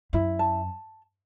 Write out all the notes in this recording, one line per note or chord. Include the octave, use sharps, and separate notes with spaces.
F#2 E4
A5